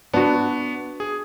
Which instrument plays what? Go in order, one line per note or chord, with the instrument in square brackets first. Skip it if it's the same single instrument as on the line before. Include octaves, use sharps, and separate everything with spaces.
[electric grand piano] B3 [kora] D4 F#4
[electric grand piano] G#4